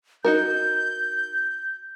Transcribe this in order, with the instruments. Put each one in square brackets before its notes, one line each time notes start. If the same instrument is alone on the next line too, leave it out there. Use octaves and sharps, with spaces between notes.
[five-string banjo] D#4 F#4 A#4 [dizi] G6